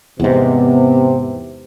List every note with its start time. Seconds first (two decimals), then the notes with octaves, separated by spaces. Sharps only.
0.20 E2 G#2 C3 B3